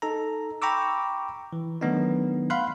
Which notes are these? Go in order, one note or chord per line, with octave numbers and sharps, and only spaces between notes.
D#4 A4 A#5
G5 A#5 B5 C#6 D6 E6
E3
D#3 F#3 A3 B3 D4 D#4
F5 F#5 B5 C6 F#6